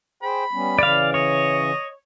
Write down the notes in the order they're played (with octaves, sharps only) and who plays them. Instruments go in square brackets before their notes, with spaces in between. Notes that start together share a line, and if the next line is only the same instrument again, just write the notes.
[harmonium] G#4 C5 G5 [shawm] B5
[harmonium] G3 B3 C#4
[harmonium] C#3 E3 [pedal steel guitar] D5 F5
[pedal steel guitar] C#5 [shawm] D#5